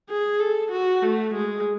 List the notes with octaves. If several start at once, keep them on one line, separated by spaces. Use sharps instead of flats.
G#4
A4
F#4
A3
G#3